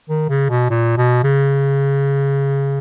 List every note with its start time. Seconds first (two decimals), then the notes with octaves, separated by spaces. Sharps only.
0.09 D#3
0.29 C#3
0.50 B2
0.70 A#2
0.97 B2
1.24 C#3